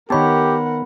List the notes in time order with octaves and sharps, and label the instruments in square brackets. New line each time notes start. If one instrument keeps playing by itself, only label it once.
[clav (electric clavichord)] D#3 C#5 A5 [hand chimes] B3 B5 [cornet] G4 [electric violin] A#4 F#5